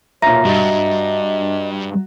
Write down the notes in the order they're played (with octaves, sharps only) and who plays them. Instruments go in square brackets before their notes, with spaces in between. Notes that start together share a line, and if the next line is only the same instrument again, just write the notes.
[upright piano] B1 A#2 [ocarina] C#5 [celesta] E5 A#5 A#6
[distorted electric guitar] G2 [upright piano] F#4 A6 [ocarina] D#5